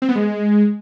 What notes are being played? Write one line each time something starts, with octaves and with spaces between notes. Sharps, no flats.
C4
B3
G#3